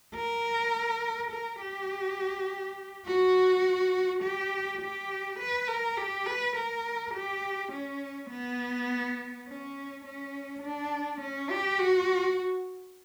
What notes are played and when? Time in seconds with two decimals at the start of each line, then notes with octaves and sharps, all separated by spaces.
0.15 A#4
1.32 A#4
1.61 G4
3.07 F#4
4.23 G4
4.81 G4
5.39 B4
5.68 A#4
5.97 G4
6.26 B4
6.56 A#4
7.14 G4
7.72 C#4
8.30 B3
9.47 C#4
10.05 C#4
10.63 D4
11.21 C#4
11.50 G4
11.79 F#4